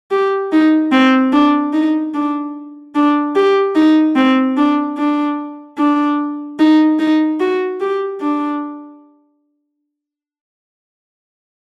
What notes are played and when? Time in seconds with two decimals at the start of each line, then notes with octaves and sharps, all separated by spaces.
0.11 G4
0.52 D#4
0.92 C4
1.32 D4
1.73 D#4
2.14 D4
2.95 D4
3.35 G4
3.75 D#4
4.16 C4
4.57 D4
4.97 D4
5.78 D4
6.59 D#4
6.99 D#4
7.40 F#4
7.81 G4
8.21 D4